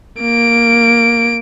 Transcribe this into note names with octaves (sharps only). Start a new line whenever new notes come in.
A#3 D7